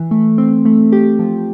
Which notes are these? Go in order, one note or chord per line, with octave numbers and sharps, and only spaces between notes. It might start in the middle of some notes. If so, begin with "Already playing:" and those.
Already playing: E3
A3
C4
A3
G4
F3